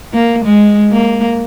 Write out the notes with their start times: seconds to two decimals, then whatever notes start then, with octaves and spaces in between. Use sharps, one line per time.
0.13 A#3
0.45 G#3
0.91 A#3